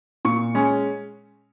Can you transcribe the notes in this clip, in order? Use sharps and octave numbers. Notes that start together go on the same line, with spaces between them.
A#2 C#6
G#3 C#4